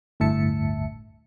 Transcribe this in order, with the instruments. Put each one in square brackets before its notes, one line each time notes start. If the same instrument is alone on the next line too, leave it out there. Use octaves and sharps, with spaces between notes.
[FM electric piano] G1 D2 A2 E5 A5 C#7